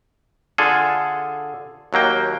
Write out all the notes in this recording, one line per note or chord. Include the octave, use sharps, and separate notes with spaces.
D3 F4 G#4 A4 G#5
D#2 F#3 A#3 G5